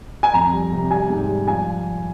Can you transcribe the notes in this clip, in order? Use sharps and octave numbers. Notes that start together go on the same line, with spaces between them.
G#5
F2 A#5
G3
C3
G3 G#5
G#2
G3
F3 G#5